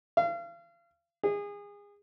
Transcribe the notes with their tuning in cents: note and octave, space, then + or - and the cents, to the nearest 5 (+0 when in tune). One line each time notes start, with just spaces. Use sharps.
F5 -35
G#4 -30